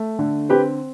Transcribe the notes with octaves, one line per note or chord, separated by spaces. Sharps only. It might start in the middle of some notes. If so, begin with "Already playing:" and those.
Already playing: A3
D3
C4 G4 B4